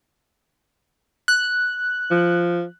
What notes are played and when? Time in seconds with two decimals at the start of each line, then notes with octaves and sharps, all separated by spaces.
1.28 F#6
2.11 F3